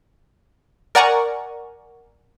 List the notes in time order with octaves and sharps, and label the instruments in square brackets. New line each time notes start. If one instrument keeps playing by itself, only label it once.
[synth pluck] A#4 D5 F#5 G#5 A#5 C#6